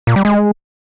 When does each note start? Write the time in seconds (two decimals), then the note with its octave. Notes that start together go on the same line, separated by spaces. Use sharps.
0.07 A#2
0.16 G3
0.25 G#3